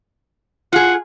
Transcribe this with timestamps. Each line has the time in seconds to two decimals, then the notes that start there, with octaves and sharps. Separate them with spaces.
0.73 F4 G#4 F#5